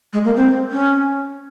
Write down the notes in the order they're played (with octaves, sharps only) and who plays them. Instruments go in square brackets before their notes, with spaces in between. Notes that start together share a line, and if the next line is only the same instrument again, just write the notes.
[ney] G#3
A#3
C4
C#4